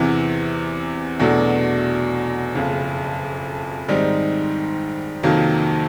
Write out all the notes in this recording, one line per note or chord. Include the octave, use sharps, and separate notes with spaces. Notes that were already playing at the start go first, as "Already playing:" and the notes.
Already playing: E2 C3 E3
E2 B2 F#3 A3 D4
F#1 F2 C#3
G#2 D#3 G3 C4 D#4
F2 C3 D#3 F#3 A#3